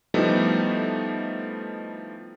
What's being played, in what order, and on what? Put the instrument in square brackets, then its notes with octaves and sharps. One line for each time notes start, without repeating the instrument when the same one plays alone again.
[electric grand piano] F3 G3 A3 B3 D#4 E4